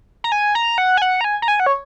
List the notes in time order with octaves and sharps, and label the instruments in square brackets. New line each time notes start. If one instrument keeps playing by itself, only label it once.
[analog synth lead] A#5
G#5
A#5
F#5
G#5
F#5
A#5
G#5
A#5
G#5
F#5
C#5